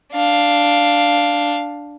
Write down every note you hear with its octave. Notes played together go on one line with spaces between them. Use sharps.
D4 F5